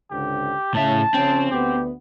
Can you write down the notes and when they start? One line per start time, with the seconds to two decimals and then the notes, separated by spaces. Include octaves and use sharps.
0.11 C#2 G#2 D3 G4
0.74 A2 C#3 E5 A5
1.14 C#3 F3 C4 C#4
1.51 D2 B3 G4